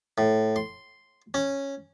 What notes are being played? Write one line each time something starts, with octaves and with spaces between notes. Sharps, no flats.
A2
C6
C#4